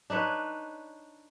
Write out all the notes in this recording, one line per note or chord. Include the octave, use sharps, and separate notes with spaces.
D4 D#4 B4 C#5